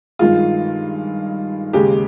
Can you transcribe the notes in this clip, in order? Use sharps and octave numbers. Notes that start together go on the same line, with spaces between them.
G2 D#3 G#3 F4
D#2 C#3 G#3 G4